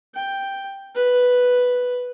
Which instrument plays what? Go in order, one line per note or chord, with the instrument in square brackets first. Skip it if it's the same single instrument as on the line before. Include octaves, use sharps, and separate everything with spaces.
[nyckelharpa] G5
B4